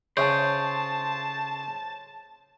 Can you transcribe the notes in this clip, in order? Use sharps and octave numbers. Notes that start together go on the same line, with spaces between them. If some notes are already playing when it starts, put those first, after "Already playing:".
C#3 C5 A5